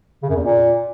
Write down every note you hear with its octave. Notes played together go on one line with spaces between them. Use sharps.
C#3
F#2
E2
A#2